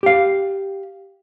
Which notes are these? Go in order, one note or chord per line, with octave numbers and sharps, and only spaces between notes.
G4 F5